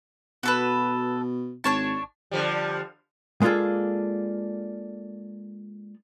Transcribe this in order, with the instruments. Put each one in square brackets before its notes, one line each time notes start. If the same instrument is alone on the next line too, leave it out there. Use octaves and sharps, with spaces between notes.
[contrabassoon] B2 [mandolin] F#4 A4 B4
[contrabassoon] G#1 [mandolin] D4 C#5 A5
[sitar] D3 F3 G3
[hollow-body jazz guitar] G#3 A#3 D4 F4 G#4 A4